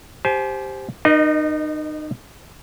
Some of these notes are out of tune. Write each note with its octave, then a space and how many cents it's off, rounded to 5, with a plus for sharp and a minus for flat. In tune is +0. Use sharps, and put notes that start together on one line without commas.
G4 +0 C5 +0 G#5 +45
D#4 -30 A#4 +35 D#5 +0